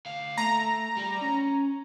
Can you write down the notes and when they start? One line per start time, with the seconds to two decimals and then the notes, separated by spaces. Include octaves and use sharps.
0.06 D2 F5
0.38 A3 A#5
0.97 G3
1.21 C#4